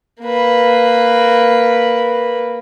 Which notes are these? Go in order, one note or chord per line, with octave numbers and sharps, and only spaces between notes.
A#3 B4